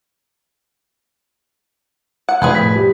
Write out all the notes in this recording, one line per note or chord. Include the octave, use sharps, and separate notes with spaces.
F#5
F1 G#4 B4 C5 D5
A2 B6
G3